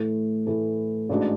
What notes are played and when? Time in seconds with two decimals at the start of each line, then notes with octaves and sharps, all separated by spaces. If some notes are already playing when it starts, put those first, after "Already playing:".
Already playing: A2 E3 A3 E4 A4
0.46 A2 E3 A3 E4 A4
1.09 A1 G#2 G#3 D4 F#4